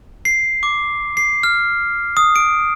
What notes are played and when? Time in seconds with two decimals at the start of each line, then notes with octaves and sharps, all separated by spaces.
0.25 C7
0.63 D6
1.17 C7
1.43 F6
2.17 D#6
2.36 D7